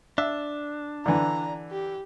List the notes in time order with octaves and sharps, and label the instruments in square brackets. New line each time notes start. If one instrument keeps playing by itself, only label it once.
[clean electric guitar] D4 [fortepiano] E5
[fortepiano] D3 E3 [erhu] A#5
[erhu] G4